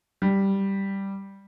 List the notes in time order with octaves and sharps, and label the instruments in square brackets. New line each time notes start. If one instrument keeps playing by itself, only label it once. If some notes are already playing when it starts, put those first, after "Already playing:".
[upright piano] G3